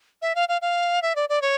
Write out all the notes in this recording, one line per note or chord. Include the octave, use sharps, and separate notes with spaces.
E5
F5
F5
F5
E5
D5
D5
C#5